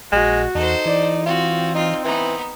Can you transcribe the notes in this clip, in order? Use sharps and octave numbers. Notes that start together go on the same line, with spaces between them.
A#1 G#3 F#4
E2 D#4 A4 C5
E3 D5
C4 F4 F#4
D#4 F4
E3 B3 D#4